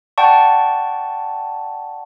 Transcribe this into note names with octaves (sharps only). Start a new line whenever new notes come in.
D5 F#5 G5 A5 C#6